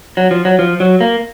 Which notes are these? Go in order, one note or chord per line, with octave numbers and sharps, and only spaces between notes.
F#3
F3
F#3
F3
F#3
A#3